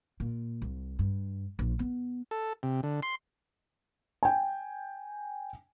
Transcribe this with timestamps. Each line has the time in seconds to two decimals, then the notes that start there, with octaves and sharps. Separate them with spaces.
0.20 A#2
0.62 C2
0.99 G2
1.59 A#1
1.79 B3
2.31 A4
2.63 C3
2.83 D3
3.03 C6
4.23 G5 G#5